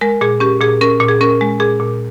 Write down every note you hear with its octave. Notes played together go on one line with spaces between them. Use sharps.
G#3 A#4
A#2 G#4
C#4 G4
A#2 G#4
C#4 A#4
A#2
G#4
C#4 A#4
G#3
A#2 G#4
A#2